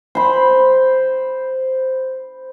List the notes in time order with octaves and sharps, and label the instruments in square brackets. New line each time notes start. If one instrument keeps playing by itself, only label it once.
[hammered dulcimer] C5 B5